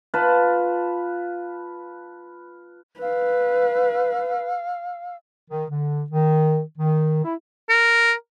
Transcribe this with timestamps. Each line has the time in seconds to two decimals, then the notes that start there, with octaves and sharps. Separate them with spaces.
0.14 F4 B4 A5
3.00 B4 F5 E6
5.50 D#3
5.70 D3
6.10 D#3
6.78 D#3
7.23 E4
7.69 A#4